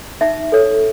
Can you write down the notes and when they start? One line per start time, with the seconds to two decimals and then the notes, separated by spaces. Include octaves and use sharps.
0.21 D#4 E5
0.52 A4 C#5